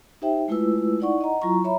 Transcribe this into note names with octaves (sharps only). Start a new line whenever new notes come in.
D#4 G4 C5 E5 G5
G#3 A3 E4 F4 B4 E6
D#4 E4 D5 F#5 C#6
D#5 F#5 A#5
F#3 E4 F4 A#5 C#6
C#5 E5 A#5 B5